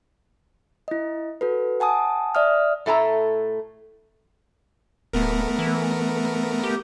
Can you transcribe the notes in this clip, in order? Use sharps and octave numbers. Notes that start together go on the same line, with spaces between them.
E4 D#5
F#4 A4 B4
F#5 G#5 A5 D#6
D5 E5 D#6 F6
A2 A3 G#5 A#5
D1 A3 B3 A#4
E3
G4